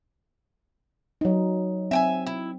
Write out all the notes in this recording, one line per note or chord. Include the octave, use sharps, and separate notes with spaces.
F#3 D#4
C4 E5 G5 G#5
E4